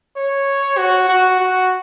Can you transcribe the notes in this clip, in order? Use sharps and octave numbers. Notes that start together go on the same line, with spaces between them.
C#5
F#4
F#4
F#4